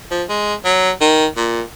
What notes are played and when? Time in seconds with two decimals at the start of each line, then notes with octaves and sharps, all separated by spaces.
0.11 F3
0.29 G#3
0.65 F#3
1.01 D#3
1.37 A#2